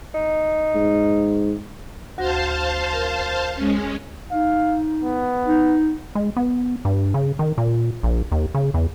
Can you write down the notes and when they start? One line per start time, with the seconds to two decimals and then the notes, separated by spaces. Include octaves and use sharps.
0.14 D#4
0.75 G#2
2.18 D2 F#4 C5 F5 A5 A#6
2.93 A#4
3.55 G#3 C#4
4.31 D#4 F5
5.03 B3
5.45 D#4
6.15 G#3
6.37 B3
6.85 G2
7.14 C#3
7.39 D#3
7.58 A#2
8.03 A#1
8.32 D#2
8.55 C#3
8.74 E2